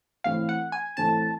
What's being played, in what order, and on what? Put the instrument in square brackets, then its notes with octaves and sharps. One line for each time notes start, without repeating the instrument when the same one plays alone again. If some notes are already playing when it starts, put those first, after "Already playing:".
[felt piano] A2 E3 A3 C4 [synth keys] F5
[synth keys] F#5
G#5
[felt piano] A2 E3 A3 C4 [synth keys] A5